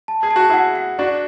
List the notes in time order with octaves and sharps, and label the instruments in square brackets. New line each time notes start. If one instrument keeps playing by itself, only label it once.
[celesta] A5
[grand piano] G#4
[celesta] A5
[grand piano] F#4
[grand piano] E4 G#4 [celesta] F#5
[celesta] F#5
[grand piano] D4 F#4 [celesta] D5